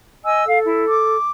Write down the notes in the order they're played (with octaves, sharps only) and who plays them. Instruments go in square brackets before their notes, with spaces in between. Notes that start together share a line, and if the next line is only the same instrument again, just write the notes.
[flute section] D#5 G#5 E6
[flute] A4 [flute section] F5
[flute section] E4
D6